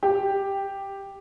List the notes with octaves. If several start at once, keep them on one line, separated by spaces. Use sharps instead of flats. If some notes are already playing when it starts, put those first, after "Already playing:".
G4